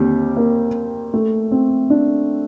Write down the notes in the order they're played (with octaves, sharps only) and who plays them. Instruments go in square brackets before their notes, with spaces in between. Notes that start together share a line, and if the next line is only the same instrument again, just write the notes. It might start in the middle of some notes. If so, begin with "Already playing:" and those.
Already playing: [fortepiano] D#2 D3 G3 [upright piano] C4
[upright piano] A#3
A3
C4
D4